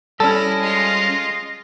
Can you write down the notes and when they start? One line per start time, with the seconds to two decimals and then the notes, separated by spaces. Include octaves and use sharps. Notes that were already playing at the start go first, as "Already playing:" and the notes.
0.20 G3 C#4 E4 A4 D#5
0.59 G#3 F4